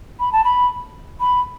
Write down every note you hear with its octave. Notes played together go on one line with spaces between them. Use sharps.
B5
A5
B5
B5